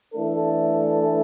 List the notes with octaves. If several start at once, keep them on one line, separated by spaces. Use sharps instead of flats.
E3 A3 D4 A4